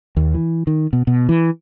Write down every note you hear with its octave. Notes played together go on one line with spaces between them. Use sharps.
D#2
E3
D#3
B2
B2
E3